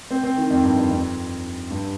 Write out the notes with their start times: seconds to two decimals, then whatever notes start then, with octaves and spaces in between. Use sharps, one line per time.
0.11 C4
0.24 C4
0.37 D#3
0.50 F2
0.63 G2
0.77 F2
0.91 F2
1.70 G2